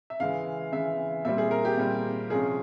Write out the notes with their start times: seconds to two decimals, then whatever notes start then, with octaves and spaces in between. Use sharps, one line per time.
0.10 E5
0.20 C#3 E3 G#3 F5
0.72 C#3 E3 G#3 E5
1.25 A#2 G3 C4 E5
1.38 G#4
1.51 A#4
1.65 G4
1.77 A#2 G3 C4
2.30 C3 F3 G#3 C#4 G#4